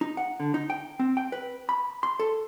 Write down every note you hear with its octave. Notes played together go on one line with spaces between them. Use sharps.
D#4
F#5
D3
D#4
G5
C4
G5
B4
B5
C6
A4